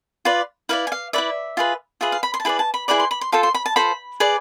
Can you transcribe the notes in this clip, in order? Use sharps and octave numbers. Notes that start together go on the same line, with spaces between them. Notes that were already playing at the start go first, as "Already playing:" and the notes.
F4 B4 D5
E4 B4 D5 F5
G#5
F5
E4 B4 D5 E5
F4 G#4 B4
F4 G#4 B4 E5
F5
B5
C6
A5
E4 G#4 B4 D5 B5
A5
B5
E4 G#4 B4 D5 B5
C6
B5
C6
F4 A4 C5 A5
C6
B5
A5
F4 A4 C5 B5
G#4 B4 D5